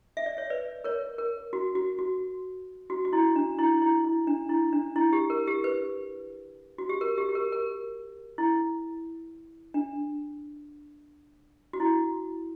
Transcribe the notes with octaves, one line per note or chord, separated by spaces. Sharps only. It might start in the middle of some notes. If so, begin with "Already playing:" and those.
E5
D5
C#5 E5
B4 D5
A#4 C#5
A#4
F#4
F#4
F#4
F#4
F#4
E4
D4
E4
E4
E4
D4
E4
D4
E4
G4
A#4
G4
B4
F#4
G4
A#4
G4
G4
A#4
A#4
E4
D4
F#4
E4